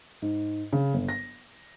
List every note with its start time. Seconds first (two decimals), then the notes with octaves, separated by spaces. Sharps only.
0.22 G#2
0.73 C#3
0.94 G1
1.09 A#6